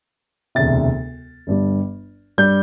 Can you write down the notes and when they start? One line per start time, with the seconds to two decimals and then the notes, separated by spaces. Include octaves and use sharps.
0.55 E1 D2 C3 A6
1.47 G1 G2 G3
2.38 G2 G3 G6